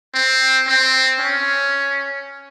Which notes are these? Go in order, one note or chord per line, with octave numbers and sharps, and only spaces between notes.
C4
C4
C#4